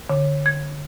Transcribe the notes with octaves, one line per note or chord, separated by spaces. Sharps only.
D3
G#6